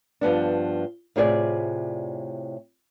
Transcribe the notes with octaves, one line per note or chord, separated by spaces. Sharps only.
G2 F3 B3 D4
A2 C3 F4 G#4 C5 D5